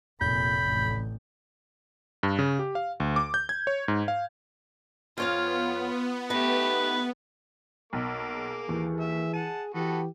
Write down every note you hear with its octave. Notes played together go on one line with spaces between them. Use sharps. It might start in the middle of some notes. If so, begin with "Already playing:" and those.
F1 A#2 B5 G6
A1
G2
C#3
G4
F5
D2
D6
G6
G#6
C#5
G#2
F5
F2 B3 F4 C#5 F5
A3 D#4 G4 B4
B1 A#3 D6
G#4
D#2 E3
E5
F#5 A5 D#7
E3 B3 F#4 G4 A4